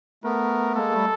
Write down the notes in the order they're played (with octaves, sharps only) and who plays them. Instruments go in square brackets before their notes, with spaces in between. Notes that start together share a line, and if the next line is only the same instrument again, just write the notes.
[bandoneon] A3 B3 [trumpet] A#4
[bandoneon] G#3 A#3 [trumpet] A4
[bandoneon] G3 A3